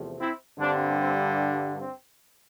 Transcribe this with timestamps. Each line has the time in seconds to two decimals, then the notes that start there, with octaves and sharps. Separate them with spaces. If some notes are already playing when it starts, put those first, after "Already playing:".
Already playing: E2 C3 F3 A3
0.19 C4 E4
0.59 G2 D3 G3 C4 D4
0.99 C4
1.79 C4